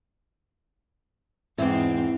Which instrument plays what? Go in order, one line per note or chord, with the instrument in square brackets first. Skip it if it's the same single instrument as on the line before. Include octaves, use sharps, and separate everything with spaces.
[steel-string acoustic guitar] E2 [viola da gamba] G#2 C4